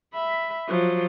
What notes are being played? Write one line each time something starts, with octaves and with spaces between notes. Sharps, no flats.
E5 B5
F3 F#3